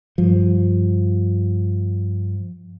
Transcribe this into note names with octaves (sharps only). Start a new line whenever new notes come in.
G2 F3